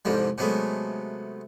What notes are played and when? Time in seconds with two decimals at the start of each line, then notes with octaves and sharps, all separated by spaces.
0.05 C2 F2 G#2 F3 G3
0.38 C3 F#3 G#3 A3 B3